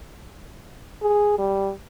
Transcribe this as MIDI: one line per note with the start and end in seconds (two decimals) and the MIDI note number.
1.02 1.34 68
1.38 1.71 55